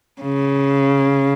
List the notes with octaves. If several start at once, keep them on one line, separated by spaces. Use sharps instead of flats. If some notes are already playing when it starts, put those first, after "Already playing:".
C#3